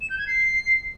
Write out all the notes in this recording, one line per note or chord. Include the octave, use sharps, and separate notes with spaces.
E7
G6
G#6
C7